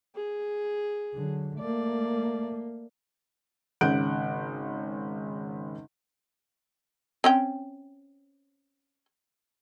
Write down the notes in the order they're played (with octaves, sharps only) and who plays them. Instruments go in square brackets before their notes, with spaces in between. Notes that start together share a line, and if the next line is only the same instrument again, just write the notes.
[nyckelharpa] G#4
[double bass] D3 F#3
[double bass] A3 A#3 [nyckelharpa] D5
[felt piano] G#1 C#3 F#5 F#6 G6 D7
[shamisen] C4 C#4 G5